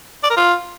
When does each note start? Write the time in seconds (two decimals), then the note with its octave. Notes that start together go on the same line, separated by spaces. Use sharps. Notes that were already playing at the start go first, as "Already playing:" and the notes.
0.24 D5
0.30 A#4
0.37 F4